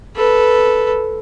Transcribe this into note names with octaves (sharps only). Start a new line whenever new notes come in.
A4 B4